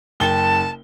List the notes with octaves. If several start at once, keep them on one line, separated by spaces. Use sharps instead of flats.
F#1 G5 A5 G7